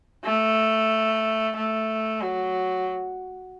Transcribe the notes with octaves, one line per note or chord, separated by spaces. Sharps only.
A3
A3
F#3